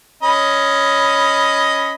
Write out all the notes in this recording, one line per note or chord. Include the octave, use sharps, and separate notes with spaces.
C#4 D#5 B5